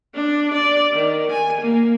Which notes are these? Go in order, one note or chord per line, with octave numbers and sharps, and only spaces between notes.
D4
D5
D#3
G#5
A#3